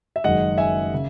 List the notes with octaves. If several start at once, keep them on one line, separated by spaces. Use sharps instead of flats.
E5
F#1 F#2 D#3 G#3 D#5 F#5
E5 G#5
C#3